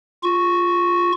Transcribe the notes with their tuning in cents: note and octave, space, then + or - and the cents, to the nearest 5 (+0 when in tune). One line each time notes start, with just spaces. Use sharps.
F4 +0 C#6 +0